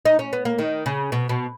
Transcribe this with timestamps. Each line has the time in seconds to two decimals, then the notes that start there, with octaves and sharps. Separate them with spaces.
0.05 D#4
0.19 C#4
0.33 B3
0.45 A#3
0.59 D#3
0.86 C#3
1.12 B2
1.29 B2